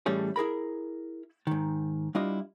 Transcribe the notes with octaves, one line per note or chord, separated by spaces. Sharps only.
A2 E3 G3 A3 C#4 G#4
E4 G#4 A#4 B5
G#2 D#3
G3 D4 E4 F4 D#5